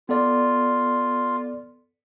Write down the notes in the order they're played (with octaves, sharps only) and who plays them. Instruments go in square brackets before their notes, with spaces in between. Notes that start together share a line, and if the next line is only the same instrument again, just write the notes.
[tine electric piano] B3 A4 D5 [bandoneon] F4